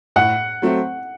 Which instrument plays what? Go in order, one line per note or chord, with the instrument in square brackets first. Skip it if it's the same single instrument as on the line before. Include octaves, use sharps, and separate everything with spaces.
[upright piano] A2 [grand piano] F#5
[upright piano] F#3 A3 C4